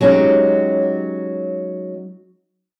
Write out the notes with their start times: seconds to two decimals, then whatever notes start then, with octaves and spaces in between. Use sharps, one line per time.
0.01 F#3 G#3 C#4 D#4 G4